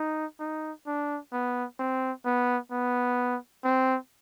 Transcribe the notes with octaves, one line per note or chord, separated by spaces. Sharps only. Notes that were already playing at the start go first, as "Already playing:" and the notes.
Already playing: D#4
D#4
D4
B3
C4
B3
B3
C4